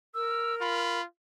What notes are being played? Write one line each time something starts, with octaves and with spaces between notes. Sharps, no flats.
A#4 E6
F4 B5